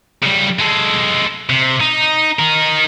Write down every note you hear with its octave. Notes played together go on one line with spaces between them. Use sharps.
C#3 G3
G#3 A4
C3
D#4
D#4 A#4